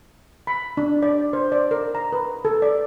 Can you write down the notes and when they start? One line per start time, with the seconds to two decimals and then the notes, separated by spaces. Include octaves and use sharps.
0.47 B5
0.77 D4
1.03 D5
1.33 C5
1.52 D5
1.71 A#4
1.95 A#5
2.13 B4
2.45 A4
2.62 D5